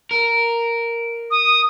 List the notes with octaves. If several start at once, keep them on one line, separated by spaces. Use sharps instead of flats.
A#4
D#6